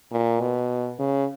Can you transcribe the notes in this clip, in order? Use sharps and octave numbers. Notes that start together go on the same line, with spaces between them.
A#2
B2
C#3